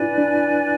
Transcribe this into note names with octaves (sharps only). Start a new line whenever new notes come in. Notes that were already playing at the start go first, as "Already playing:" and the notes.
Already playing: D4 E4 F4 B4 D5 G#5
D4